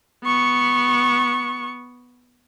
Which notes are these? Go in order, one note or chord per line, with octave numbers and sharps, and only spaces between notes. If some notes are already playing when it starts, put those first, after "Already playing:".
B3 C#6